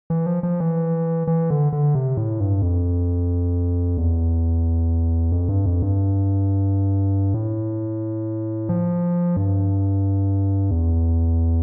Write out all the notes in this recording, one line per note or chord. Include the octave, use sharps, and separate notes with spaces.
E3
F3
F3
E3
E3
D3
D3
C3
A2
G2
F2
E2
F2
G2
F2
G2
A2
F3
G2
E2